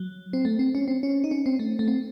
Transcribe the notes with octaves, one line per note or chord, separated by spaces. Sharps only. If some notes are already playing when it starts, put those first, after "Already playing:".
Already playing: F#3
C4
A3
C4
C#4
C4
C#4
D#4
C#4
C4
A3
A3
C4